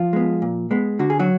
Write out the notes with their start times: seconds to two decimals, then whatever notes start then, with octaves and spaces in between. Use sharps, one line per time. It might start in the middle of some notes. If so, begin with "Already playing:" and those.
Already playing: F3 F4
0.13 G#3 B3
0.42 A#2
0.71 G#3 B3
0.99 D3 F#4
1.10 G#4
1.19 F#3 F#4